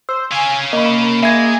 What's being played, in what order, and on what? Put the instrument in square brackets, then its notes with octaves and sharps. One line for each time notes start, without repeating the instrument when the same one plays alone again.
[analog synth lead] C5 [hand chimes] E6
[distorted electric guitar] C#4 F5 [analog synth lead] G#5
[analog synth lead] A#3 [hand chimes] D#5 B5
[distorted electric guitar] G#3 [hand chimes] E5 G#6